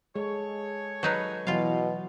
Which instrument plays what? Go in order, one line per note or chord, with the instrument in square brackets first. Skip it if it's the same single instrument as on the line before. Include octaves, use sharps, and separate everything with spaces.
[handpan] G#3 [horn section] G#4 A4 C#5
[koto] F#3 D#4 B4
[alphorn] B2 [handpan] E3 F#3 [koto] F4 F5